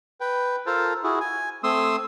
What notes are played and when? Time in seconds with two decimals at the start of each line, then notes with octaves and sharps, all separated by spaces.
0.21 B4 G5
0.66 F4 A4 A#4 C5 A5
1.03 E4 F#4 G#4
1.20 G#5
1.64 A3 C4 C6 D#6 E6